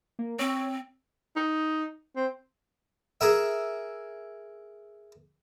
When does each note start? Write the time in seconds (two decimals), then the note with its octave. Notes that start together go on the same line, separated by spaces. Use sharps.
0.19 A#3
0.39 C4 C#5
1.36 D#4
2.16 C4
3.21 G#4 A#4 E5